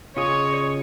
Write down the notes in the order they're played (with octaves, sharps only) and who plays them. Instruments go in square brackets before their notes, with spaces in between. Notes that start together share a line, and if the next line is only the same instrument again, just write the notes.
[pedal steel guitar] C#3 D#5 G#5 [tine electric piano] F4 G#4 [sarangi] C#5